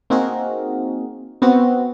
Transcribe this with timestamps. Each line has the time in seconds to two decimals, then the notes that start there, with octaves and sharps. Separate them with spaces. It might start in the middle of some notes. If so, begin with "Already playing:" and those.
0.10 A#3 C4 D#4 F#4 G#4 A#4
1.42 B3 C4 F#4